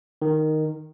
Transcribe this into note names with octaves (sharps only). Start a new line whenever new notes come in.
D#3